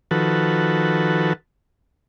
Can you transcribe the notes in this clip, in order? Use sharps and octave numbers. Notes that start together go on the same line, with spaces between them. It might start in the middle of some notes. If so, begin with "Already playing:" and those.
D#3 F3 F#4 A4 B4